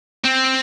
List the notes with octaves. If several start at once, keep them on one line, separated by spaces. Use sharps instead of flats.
C4